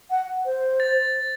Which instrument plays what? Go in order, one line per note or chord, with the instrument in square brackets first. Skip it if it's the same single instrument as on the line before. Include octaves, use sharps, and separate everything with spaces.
[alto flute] F#5
C5
[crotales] A6